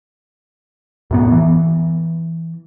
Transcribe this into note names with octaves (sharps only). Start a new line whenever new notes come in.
F#2 A2 B3
E3